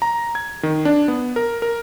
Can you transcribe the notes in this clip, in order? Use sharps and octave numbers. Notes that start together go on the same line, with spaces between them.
A#5
G#6
D#3
D4
B3
A#4
A#4